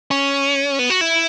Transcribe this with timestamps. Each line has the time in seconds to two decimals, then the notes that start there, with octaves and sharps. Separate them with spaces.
0.11 C#4
0.79 B3
0.90 F#4
1.01 E4